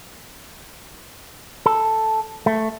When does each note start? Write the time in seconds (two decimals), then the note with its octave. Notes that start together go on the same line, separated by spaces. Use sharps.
1.66 A4
2.46 A3